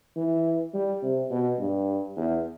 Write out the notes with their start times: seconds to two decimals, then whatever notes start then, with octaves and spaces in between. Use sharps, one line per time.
0.16 E3
0.74 G3
1.03 C3
1.31 B2
1.59 G2
2.16 E2